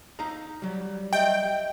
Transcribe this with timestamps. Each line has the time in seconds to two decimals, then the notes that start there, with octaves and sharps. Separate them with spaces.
0.19 D#4 F5 A#5
0.62 F#3 G3
1.13 G4 D#5 E5 G5